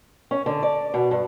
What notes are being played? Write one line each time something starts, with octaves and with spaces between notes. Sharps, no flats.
C#4
D3
D5
B2
G2